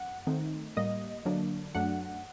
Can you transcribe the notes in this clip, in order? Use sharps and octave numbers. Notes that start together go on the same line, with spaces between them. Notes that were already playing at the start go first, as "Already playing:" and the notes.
Already playing: F#2 F#5
D#3 A3 C4 D#4
A2 G3 A#3 D#5
D3 F#3 A#3 D4
F#2 F#3 A3 D4 F#5